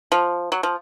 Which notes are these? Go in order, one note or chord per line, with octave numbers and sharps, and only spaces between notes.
F3
F#3
F3